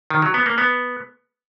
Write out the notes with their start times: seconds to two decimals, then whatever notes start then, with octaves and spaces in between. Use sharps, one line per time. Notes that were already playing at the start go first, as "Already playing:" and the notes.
0.10 D#3
0.22 F#3
0.34 B3
0.46 A#3
0.58 B3